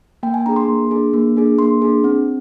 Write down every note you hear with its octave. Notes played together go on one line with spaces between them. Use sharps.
A#3 G5
G#5
D4 G#4 A#5
C6
A#3
D4 G#4
A#3
D4 G#4
A#3 C6
D4 G#4
C4